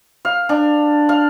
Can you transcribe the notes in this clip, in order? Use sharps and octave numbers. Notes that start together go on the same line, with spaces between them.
F5
D4
F5